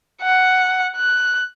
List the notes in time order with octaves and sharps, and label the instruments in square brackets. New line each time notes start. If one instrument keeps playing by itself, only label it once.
[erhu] F#5
F#6